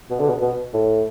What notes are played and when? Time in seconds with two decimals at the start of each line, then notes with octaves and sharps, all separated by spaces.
0.10 B2
0.19 D3
0.29 B2
0.42 B2
0.74 A2